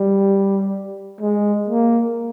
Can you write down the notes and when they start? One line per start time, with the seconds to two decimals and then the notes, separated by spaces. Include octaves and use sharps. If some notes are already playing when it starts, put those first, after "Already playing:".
Already playing: G3
1.21 G#3
1.68 A#3